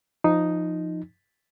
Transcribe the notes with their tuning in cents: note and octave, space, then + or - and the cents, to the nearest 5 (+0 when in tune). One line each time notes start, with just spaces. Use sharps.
F3 -5 D#4 +0